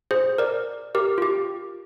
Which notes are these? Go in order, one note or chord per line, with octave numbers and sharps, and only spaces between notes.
G#4 C5
A#4 D5
G4 A#4
F4
G4